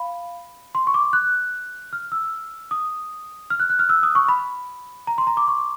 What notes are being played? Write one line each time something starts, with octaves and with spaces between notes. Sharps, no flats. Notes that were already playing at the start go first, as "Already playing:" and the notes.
Already playing: F5 B5
C6
C#6
D6
F#6
F6
E6
D#6
F6
F#6
F#6
F6
E6
D#6
C#6
B5
A#5
C6
A#5
D6
C#6